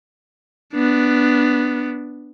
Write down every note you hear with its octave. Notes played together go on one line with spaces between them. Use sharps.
B3 D4